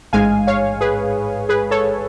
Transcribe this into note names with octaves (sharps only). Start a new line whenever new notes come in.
A1 G#2 G#3 F5 G#5
C#5 F5
G#4 B4
G#4 B4
A4 C#5